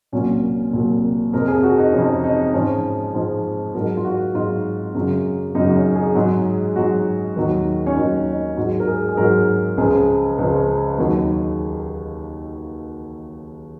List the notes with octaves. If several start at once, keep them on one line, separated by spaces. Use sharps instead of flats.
C2 A#2 F#3 C#4
C2 A#2 F#3
F2 C3 F3 A#4
G#4
G#4
F#4
D#4
F2 C3 F3 C#4
D#4
G#2 F3 C#4
G#2 F3
G#2 F#3 A#4
F4
F#4
G#2 F#3 F4
F#2 C#3 F#3
F#2 C#3 F#3 D#4
C#4
G#4
G#2 F#3
G#2 F#3 F#4
D#2 D#3 F#3
C#4
D#2 D#3 F#3 D#4
D#4
G#2 F#3 F#4
A#4
G#4
G#4
G#2 F#3 A#4
C#2 C#3 F3 G#4
C#2 C#3 F3
D#2 D#3 F#3